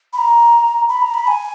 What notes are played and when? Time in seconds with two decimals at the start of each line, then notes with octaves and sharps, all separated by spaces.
0.13 B5
0.18 A#5
0.89 B5
1.02 A#5
1.14 B5
1.27 G#5